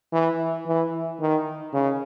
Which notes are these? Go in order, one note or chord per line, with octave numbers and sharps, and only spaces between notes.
E3
E3
D#3
C#3